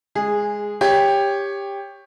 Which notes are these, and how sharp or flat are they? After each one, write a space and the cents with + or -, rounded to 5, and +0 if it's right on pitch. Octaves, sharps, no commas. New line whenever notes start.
G#3 +0 G#4 -15
G4 +15 C#5 +0